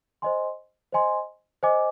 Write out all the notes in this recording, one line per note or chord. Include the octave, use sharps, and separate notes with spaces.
C5 D#5 G#5 C6
C5 D#5 G#5 C6
C5 D#5 G#5 D6